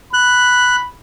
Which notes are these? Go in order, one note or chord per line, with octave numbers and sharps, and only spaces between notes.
B5 F#6